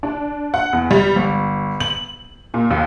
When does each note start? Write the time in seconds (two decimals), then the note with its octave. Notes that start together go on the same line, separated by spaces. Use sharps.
0.03 D4
0.54 F#5
0.73 E2
0.91 G3
1.16 G1
1.80 F#7
2.54 A#2
2.70 D#2